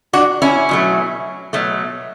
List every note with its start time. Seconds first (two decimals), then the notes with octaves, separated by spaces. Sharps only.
0.13 D4 F#4
0.42 C#4 E4
0.69 B2 F#3 A3
1.53 B2 F#3 A3